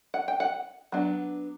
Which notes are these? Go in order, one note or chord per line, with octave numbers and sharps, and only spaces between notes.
F#5
G5
F#5
F#3 B3 D4